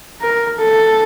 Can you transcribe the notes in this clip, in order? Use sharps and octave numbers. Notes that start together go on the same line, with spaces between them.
A#4
A4